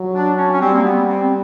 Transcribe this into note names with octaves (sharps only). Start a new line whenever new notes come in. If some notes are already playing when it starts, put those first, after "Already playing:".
Already playing: F#3
D4
C#4
C#4
G3 C4
A#3
B3
C4